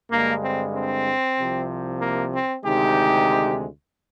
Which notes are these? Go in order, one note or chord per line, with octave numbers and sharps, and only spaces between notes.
G2 D3 G#3 A#3
C4
C4
C2 C3 F3
A#3
C4
D2 C3 D#3 G#3 D#4 G4